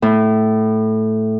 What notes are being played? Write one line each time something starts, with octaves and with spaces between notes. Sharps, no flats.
A2